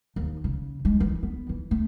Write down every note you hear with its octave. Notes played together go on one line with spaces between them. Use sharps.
D#2
C#3
G#3
E3
B3
E3
A3